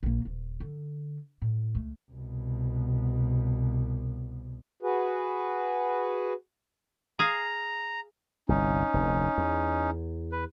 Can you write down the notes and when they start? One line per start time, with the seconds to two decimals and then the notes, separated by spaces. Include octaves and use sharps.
0.03 A#1 A#3
0.25 D#1
0.60 D3
1.42 A2
1.75 C#2 A3
2.11 C2 B2
4.83 F#4 G#4 B4
7.19 G#4 F5 A#5
8.49 G1 C2 C#4 D#4
8.94 F1 D2
9.38 E2
10.32 B4